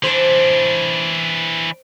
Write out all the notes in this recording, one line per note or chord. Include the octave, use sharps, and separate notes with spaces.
E3 D4 C5